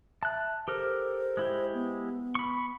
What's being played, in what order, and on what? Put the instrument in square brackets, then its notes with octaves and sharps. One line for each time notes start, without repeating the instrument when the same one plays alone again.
[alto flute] E5 [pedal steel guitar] A5 F#6
[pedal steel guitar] G4 A4 A#4 [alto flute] C5
[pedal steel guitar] G#3 E4 G4
[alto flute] B3
[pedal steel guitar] B5 C#6